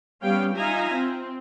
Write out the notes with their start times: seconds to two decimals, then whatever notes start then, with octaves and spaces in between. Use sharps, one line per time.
0.22 G3 B3 C#4 F5 G5
0.55 D#4 F4 E5 F5 G#5 A#5
0.93 C4